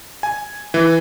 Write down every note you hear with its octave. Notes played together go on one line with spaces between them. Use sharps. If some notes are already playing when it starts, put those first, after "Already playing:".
G#5
E3